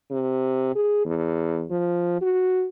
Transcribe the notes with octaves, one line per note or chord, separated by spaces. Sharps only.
C3
G#4
E2
F3
F#4